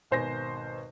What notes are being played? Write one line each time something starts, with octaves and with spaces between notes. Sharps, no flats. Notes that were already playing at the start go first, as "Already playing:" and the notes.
G#1 B2 C5 G#5 A#6